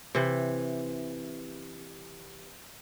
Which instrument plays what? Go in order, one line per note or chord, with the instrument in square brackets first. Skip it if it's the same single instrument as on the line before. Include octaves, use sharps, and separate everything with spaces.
[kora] C3 E3